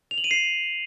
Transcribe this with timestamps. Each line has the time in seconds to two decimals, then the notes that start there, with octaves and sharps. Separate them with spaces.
0.11 F7
0.18 F#7
0.24 D#7
0.31 C7